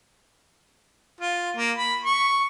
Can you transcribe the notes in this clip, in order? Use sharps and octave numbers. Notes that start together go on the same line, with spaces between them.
F4
A#3
B5
C#6